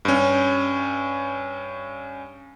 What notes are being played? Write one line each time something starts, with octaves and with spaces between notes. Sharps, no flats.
G2 C#4